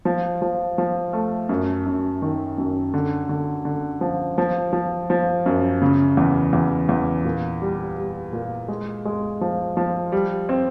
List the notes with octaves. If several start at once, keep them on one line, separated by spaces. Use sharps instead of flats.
F3
F3
F3
A3
F#2
F#2
D#3
F#2
D3
D3
D3
F3
F3
F3
F3
F#2
C#3
E2
E2
E2
A#2
G3
G3
A#2
G#3
G#3
F3
F3
G3
C4